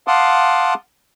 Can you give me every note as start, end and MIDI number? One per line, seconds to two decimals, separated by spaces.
0.07 0.74 77
0.07 0.74 78
0.07 0.74 81
0.07 0.74 84
0.07 0.74 86
0.07 0.74 87